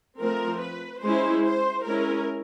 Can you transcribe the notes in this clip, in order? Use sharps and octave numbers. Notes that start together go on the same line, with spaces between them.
F3 A3 C4 A#4
B4
G#3 C#4 E4 C5
C5
G#3 C#4 E4 A#4